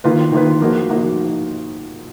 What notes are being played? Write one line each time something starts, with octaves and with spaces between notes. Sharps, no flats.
D#3 A#3 F4 B4
D#3 A#3 F4 B4
F3 A#3 D#4 F#4
F3 A#3 D#4 F#4